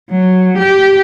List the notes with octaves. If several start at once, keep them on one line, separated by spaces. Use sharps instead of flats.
F#3
G4